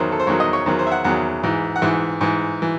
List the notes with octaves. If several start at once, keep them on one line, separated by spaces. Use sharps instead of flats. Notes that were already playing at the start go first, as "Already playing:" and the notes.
Already playing: E2 D#3 F#3 C5
A4
C5
E2 D#3 F#3 C#5
D#5
C#5
E2 D#3 F#3 C5
C5
E5
F#5
E2 D#3 F#3 F#5
G#2 E3
F#5
G#2 E3 E5
G#2 E3
E3